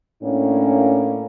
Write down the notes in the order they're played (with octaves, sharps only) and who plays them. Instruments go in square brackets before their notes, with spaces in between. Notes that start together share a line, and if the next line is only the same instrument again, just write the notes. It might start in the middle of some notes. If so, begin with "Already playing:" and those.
[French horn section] A2 A#3 C#4 D4